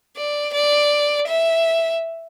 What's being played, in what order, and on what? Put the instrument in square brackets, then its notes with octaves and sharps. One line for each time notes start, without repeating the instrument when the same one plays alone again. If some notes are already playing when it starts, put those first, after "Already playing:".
[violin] D5
D5
E5